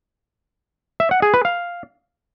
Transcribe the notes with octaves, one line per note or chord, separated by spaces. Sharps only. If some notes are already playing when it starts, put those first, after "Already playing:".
E5
F#5
G#4
B4
F5